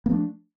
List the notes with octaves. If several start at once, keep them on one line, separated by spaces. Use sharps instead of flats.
F3 A3 A#3 D4